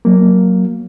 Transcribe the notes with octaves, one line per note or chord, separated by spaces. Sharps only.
F#3 A#3